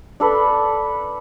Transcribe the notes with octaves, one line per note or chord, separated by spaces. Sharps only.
D4 A4 B4